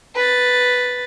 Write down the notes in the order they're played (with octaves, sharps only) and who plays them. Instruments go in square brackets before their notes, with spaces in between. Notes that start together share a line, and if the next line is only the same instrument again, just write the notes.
[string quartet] B4 A6